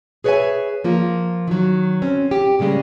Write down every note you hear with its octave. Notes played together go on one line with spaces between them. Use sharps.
G#4 B4 C#5 D5 E5 G#5
F3 A#3 F4
D#3 F#3
C4 C#4
G4
A#2 C#3 G3 G#3